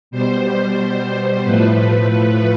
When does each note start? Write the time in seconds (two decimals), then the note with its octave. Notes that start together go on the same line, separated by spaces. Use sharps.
0.11 B2 G3 C5
1.44 A2 F3 A3 B4
2.10 B4